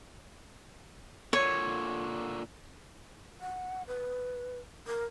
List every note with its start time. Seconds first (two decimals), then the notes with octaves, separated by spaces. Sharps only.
1.33 A#2 D3 C#5
3.41 F#5
3.88 B4
4.87 A#4